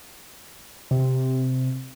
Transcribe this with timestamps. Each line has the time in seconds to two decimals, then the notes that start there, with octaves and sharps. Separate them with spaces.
0.91 C3